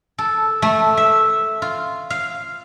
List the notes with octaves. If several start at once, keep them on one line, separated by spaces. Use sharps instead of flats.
A4
A3
E5
F4
F5